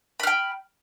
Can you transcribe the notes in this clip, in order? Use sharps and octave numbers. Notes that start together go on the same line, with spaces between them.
G5 B5 F6